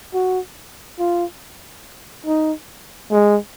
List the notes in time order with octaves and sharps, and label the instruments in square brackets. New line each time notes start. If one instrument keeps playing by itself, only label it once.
[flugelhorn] F#4
F4
D#4
G#3